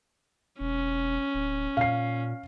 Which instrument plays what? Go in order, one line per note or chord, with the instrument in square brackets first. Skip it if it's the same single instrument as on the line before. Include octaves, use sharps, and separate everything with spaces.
[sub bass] E1 [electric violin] C#4
[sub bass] D1
[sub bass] A#2 [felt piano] F5 C7